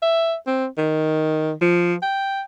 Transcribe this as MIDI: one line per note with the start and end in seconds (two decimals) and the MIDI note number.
0.02 0.34 76
0.47 0.67 60
0.78 1.53 51
1.61 1.95 53
2.02 2.42 79